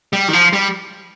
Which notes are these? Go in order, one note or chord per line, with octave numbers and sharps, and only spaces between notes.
G3
D#3
F3
G3